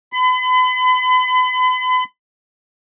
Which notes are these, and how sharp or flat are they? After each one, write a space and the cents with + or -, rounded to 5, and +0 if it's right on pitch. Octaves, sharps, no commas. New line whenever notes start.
B5 +40